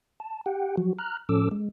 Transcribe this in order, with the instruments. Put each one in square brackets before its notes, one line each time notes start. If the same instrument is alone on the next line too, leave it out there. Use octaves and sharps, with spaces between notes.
[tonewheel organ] A5
G4 F#5 G5
F3 F#3 F#4
A#5 F6 F#6
A2 F3 C#4 A4 D6 E6
G#3